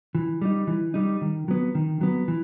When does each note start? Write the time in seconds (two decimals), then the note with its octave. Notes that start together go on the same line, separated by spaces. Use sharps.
0.15 E3
0.42 G3 D#4
0.67 E3
0.94 G3 D#4
1.22 D#3
1.48 F#3 B3
1.75 D#3
2.01 F#3 B3
2.28 E3